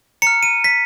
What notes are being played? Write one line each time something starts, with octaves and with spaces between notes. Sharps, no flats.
A#5 F6 C#7
D#7
B6